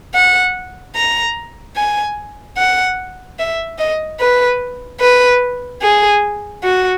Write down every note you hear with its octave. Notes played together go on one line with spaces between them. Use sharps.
F#5
A#5
G#5
F#5
E5
D#5
B4
B4
G#4
F#4